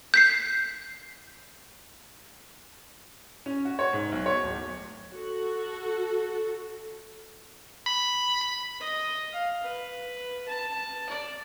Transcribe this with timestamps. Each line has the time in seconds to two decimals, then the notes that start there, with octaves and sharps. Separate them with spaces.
0.14 G6 B6 C7
3.46 C#4
3.65 F#4
3.79 C#5
3.93 G#2
4.12 B1
4.26 C#5
4.44 D1
5.14 F#4 A4
7.86 B5
8.80 D#5
9.33 F5
9.63 B4
10.48 A5
11.09 D5